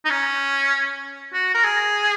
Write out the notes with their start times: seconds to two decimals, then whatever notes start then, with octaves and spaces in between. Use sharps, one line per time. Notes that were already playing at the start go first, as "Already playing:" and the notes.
0.05 D#4
0.10 C#4
1.33 F#4
1.54 A#4
1.64 G#4